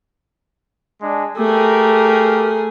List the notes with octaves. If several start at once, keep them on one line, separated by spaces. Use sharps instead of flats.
G#3 D4
A3 G4 G#4 A#4